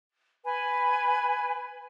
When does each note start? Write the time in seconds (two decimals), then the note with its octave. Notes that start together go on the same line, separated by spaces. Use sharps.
0.45 B4 G#5